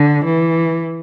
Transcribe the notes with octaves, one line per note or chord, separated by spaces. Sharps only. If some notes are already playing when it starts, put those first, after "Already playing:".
Already playing: D3
E3